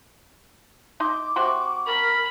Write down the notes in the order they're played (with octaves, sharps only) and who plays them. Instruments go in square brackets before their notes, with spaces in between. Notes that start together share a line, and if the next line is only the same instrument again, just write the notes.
[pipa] D#4 C6 [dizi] D6
[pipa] C3 F#4 C6
[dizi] A#4 [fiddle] B5